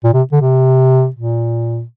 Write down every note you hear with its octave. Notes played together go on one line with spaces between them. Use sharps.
A#2
C3
D3
C3
A#2